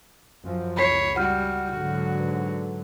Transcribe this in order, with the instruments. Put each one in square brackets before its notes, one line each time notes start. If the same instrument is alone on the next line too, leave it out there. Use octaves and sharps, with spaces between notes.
[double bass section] F#2 F3
[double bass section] C#2 [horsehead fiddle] C#5 [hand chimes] B5 B6 C7
[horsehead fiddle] G3 F#4 [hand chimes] F#5 F6 G6
[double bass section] G#2 D3 F#3 [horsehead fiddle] F#4
[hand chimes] B4